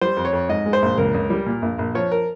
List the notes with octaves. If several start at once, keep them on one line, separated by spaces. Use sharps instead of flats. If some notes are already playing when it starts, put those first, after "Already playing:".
G3 C5
F2
C#5
F2
G#2 D#5
G#3
C5
A#1
C#2 A#4
C#2
G3
A#2
A#1
A#1
F3 C#5
A#4